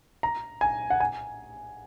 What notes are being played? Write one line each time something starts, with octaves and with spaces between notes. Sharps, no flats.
A#5
G#5
F#5
G#5